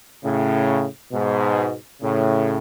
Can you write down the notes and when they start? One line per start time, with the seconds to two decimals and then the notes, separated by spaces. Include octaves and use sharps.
0.23 A2 C#3
1.12 G#2 B2
2.01 A2 C#3